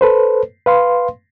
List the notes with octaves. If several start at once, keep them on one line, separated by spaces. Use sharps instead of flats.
A4 B4 C5
B4 F5 C6